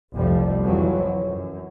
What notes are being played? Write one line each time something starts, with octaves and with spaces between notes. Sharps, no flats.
F1 C2 F2 F3 G3
F2 E3 F#3
F#2